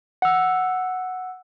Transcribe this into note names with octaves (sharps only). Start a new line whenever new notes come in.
F#5 E6